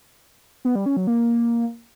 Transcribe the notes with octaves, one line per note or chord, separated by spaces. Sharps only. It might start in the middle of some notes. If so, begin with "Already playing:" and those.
B3
G3
C#4
F#3
A#3